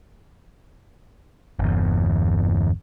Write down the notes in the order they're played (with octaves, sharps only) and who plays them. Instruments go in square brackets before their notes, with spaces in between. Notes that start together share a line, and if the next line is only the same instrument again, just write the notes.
[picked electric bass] G1 E2